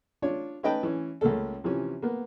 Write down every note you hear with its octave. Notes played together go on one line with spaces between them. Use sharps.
D4 F4 C#5
C#4 D#4 B4 D#5 G5 A5
E3 C#4
C#2 C#3 A3 A#3 A4
C3 E3 F3 C#4
A#3 B3